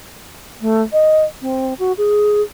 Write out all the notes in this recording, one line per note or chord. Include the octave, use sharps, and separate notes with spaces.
A3
D#5
C4
F#4
G#4